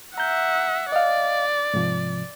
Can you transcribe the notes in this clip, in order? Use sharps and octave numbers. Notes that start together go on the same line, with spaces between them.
E5 F#5 A#5 G6
D5 D#5 F5
G#2 C3 F3